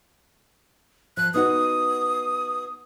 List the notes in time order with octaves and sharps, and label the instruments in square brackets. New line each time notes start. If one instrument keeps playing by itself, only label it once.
[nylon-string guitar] F3 [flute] F#6
[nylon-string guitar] B3 D#4 F#4 [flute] D#6